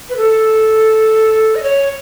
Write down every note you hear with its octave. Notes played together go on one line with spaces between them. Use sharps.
B4
A4
D#5
C#5